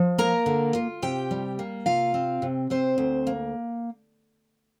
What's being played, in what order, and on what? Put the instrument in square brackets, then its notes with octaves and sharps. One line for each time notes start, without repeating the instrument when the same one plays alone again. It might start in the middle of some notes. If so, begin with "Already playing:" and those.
Already playing: [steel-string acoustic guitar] F3
A#3 A#4 A#5
D3
F4
C3 G4 G5
G3
A#3
C3 F4 F5
C4
C3
C3 C4 C5
D2
A#3